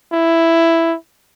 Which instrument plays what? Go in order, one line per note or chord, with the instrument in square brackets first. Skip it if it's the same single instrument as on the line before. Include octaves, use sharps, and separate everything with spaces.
[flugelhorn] E4